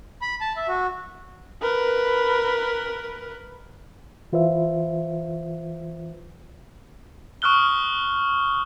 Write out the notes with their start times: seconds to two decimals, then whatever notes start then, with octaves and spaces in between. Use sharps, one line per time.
0.21 B5
0.41 A5
0.56 E5
0.68 F#4
1.62 A#4 B4
4.33 E3 F4 B4 C5 E5
7.42 C#6 D#6 F6 F#6 G7